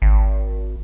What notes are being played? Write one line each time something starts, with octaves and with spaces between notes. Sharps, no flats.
G#1